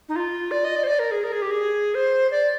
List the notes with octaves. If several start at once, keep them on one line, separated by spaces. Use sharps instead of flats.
D#4
F4
D5
D#5
D5
C5
D5
A#4
G#4
A#4
G#4
G4
G#4
C5
D5